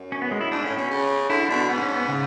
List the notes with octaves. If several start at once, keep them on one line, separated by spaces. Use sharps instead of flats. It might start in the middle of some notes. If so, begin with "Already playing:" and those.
Already playing: F#2
C#4
B3
G#3
E4
G#2 D4
A2 C#4
B2 C#4
C#3
D3 E4
B2 D4
G#2 B3
C#4
B3
C#3